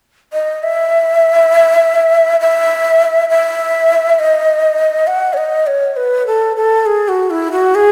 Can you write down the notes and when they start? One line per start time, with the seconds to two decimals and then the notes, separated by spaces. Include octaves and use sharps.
0.33 D#5
0.63 E5
2.40 E5
3.29 E5
4.19 D#5
5.07 F#5
5.33 C#5
5.37 D#5
5.67 C#5
5.96 B4
6.27 A4
6.57 A4
6.86 G#4
7.08 F#4
7.30 E4
7.52 F#4
7.75 G#4